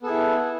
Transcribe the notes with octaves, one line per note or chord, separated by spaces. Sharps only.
B3 E4 G#4 A4